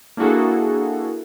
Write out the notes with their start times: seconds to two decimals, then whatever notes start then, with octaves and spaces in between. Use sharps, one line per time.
0.17 A#3 D4 E4 F#4 G#4 A4